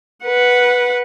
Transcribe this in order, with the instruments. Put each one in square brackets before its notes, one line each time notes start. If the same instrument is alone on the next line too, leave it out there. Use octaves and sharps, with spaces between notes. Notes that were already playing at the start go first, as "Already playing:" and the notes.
[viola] B4 F#5